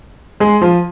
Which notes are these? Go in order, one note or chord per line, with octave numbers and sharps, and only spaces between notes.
G#3 G#4
F3 F4